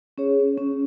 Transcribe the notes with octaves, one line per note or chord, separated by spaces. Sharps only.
C#4 G#4 C#5
C#4